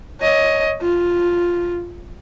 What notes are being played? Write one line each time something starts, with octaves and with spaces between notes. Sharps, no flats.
C#5 D#5
F4